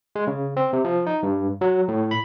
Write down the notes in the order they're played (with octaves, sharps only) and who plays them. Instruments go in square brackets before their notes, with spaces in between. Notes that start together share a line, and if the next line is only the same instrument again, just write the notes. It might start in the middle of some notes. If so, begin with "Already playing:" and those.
[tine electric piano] G#3
C#3
C4
C3
F3
D#4
G2
F#3
A2
B5